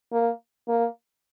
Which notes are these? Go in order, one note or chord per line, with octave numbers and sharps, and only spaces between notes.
A#3
A#3